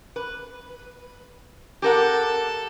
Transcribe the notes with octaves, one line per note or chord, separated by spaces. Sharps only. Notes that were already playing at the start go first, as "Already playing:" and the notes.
B4
G4 A4 A#4 F#5